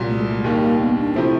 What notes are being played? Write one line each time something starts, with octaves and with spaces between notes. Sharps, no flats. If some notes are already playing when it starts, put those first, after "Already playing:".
Already playing: C2 A#2 F#3
A3
G#3
A3
G#3
D#2 D#3 G3 A#3
B3
D4
C3 F3 A3 C4 E4